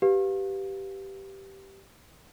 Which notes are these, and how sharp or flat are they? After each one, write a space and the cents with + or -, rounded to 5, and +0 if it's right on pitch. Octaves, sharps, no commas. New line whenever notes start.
G4 -10 B4 +0 F5 +15